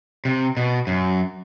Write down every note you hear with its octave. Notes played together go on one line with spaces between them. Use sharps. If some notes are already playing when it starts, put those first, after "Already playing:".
C3
B2
F#2